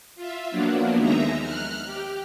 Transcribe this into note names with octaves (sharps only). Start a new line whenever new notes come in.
F4 E5
F3 F#3 A#3 B3 D4
D#2 G#3 D#4 E5 A#5
F6 F#6
G4